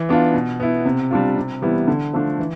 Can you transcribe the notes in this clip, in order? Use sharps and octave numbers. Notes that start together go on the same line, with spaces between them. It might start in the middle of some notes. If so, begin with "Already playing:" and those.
Already playing: E3
B3 D4 F4
B2
B3 E4
C3
G3 D4 F4
C3
E3 G3 B3 E4
D3
F3 A3 D4
E3